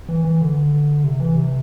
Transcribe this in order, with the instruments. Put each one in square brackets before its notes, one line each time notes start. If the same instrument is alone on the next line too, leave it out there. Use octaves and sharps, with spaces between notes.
[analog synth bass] E3
E3
D3
C3
E3
C3